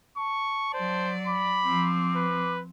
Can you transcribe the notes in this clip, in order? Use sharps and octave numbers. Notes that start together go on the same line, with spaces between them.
A5 C#6
F#3 C5 D5
B5 D6
F3 C4
B4